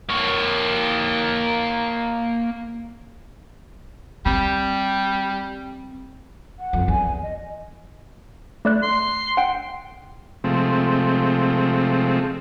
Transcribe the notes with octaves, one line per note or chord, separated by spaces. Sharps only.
A#3 C#5
G3 C4
F#5
F2
E2 G#5
D#5
A3 D5 F#6
C6
F#5 G5
C3 F3 G#3 A3 C4